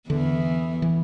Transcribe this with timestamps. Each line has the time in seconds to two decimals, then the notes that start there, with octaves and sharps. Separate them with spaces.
0.09 E2 D3 E3
0.82 E3